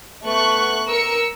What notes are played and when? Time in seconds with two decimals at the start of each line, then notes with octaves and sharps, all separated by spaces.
0.25 A3 B3 C#6 F#6
0.89 A#4 E6 C#7